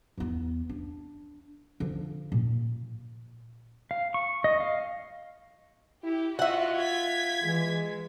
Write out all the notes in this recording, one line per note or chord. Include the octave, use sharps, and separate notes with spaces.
E2 B3
D4
D3 F3
A#2
F5
C#6
D#5
F5
E4 G4
F4 F#4 D#5 E5 F#5
G#6 B6
E3 G#3